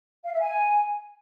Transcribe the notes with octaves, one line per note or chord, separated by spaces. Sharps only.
F5
E5
G#5